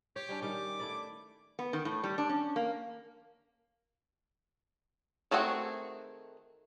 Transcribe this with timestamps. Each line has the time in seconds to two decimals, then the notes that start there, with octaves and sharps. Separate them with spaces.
0.16 G4 C#5
0.29 G3 C#4 D4
0.42 D#3 G3 C#4 D6
0.79 A3 E4 D5
1.59 B3
1.73 D#3
1.85 A2
2.04 G3
2.18 D4
2.29 C#4
2.56 A#3
5.31 D#3 A3 C4 F#4 G#4